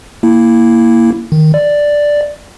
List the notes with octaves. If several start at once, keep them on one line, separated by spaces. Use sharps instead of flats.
A#3 E4
D#3
D5